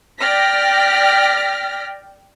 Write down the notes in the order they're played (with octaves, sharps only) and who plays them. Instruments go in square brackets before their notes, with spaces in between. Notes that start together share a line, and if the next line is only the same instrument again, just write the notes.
[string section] D5 G5 F6 A#6 B6